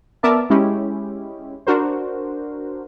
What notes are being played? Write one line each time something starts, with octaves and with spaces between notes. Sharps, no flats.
B3 A#4 D5 E5 A5
G#3 C#4 E4 G4
D4 F#4 A#4 C5